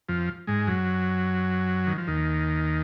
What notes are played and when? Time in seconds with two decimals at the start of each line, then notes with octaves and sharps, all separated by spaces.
0.09 F2 F3
0.47 G#2 G#3
0.67 F#2 F#3
1.87 D#3
1.98 F3
2.07 D#2 D#3